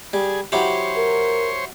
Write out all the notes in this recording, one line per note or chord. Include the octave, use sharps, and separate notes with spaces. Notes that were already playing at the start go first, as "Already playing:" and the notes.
G3 G#4
F#3 E4 G4 C5 C#5
A#4